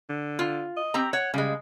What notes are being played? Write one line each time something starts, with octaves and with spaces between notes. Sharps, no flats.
D3
F4
D#5
C4 G4 A#5
C#5 F#5
C#3 G3 G#3